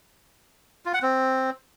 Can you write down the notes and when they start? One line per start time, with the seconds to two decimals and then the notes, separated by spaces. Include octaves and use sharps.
0.85 F4
0.94 F#5
1.02 C4